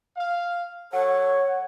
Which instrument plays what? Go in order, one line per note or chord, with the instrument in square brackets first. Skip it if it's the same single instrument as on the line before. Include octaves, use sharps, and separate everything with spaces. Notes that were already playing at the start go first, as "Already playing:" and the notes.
[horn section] F5
[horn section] F#3 A4 [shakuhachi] C#5 [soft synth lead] F#5